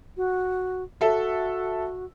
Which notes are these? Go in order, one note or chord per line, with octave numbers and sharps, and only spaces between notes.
F#4
F#4 A4 E5